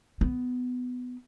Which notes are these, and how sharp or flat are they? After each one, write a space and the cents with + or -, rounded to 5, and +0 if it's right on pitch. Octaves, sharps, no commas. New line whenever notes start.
B3 +15